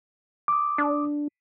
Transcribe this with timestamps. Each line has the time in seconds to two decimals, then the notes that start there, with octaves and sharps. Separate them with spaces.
0.48 D6 D#6
0.78 D4